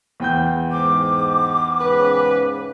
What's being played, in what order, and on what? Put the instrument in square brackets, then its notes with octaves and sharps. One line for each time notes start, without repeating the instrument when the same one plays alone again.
[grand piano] E2 G5 G6
[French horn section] G#2 [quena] D6
[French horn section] G#2 C#3 C#4 [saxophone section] B4